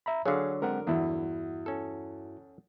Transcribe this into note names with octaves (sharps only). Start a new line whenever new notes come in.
E5 A#5 B5
D3 F#3 G#4 C#5 F5
G#3 C4 A#4 F#5
E2 G2 E4 F#4
C#4 A4